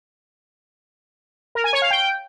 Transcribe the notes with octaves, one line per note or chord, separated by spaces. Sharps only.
A#4
G#5
C#5
F5
G5